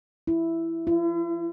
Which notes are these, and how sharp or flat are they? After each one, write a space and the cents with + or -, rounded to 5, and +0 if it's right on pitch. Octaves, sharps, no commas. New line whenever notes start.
E4 +5
E4 +45